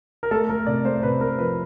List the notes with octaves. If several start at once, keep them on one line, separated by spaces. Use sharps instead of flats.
A#4
A3 A4
A3 A#4
C3 D5
A3 C5
C3 B4
A3 A#4
F3 B4